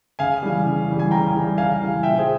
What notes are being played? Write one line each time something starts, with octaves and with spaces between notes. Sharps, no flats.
C#3 F5 G#5
E3 G3
C#3
E3 G3
G#5
C#3 G5 A#5
E3 G3
C#3 F5 G#5
E3 G3
A#2 E5 G5
G#4 C5